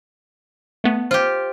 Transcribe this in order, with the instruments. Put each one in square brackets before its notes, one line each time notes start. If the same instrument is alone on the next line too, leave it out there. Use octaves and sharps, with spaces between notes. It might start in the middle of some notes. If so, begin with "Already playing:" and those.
[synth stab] A3 B3
[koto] F4 G4 [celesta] C5